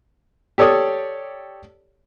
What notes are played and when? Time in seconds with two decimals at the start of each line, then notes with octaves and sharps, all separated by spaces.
0.58 G4 A4 C#5 D5 D#6